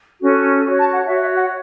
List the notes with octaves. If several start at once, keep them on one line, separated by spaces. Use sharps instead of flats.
C#4 F#4 A4
F#4 C#5 C#6
A5
F#5
F#4 C#5 E5
E5
F#5